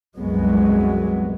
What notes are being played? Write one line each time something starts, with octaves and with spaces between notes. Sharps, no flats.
C2 F#2 F#3 G#3 B3